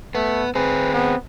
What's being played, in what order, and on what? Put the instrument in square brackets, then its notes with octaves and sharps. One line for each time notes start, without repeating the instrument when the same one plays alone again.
[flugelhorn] A3 [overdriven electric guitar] B3
[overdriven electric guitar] C4 G#4 [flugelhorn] B4
[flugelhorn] B3